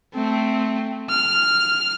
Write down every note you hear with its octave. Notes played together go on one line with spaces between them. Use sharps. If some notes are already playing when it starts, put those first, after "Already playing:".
A3 C4
F6